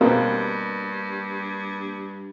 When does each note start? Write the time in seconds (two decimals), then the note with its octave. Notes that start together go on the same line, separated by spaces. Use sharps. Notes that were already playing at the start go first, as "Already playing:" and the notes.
0.01 G2 B2 A#3 C4